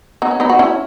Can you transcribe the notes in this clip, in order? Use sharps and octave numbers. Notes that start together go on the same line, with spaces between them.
B3 D#4
C#4
B3 D#4
F#4
C#4 E4